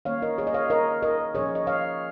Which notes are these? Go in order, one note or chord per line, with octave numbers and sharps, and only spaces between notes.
D#3 A#3 C#4 C#5 F5
A#4 D#5
G#4 C#5
D#5
C#5 F5
A#4 D#5
A#4 D#5
A#2 F3 C#4 G#4 C#5
D#5
C#5 F5